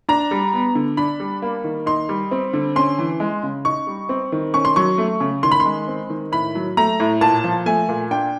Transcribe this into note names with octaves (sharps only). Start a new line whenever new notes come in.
D4 A#5
G3
B3
D3
D4 B5
G3
A#3
D#3
D#4 C6
G3
C4
D3
C#4 C6
E3
G#3
C#3
D#4 C#6
G3
C4
D#3
C#4 C#6
C6
F#3 C#6
A3
C#3
D#3 C6
B5
C6
G#3
C4
D#3
A2 B5
F#3
A3 A#5
A2
A#2 A5
F3
A3 G#5
A#2
D4 G5